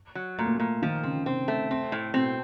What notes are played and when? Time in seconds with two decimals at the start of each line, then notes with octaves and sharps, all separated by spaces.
0.15 F#3
0.38 A#2 A3
0.46 A#3
0.55 A#2 A3
0.82 D#3 F3
1.03 C#3 C4
1.16 C#3
1.26 C3 C4
1.48 A3
1.71 C4
1.92 A2
2.14 B2 C4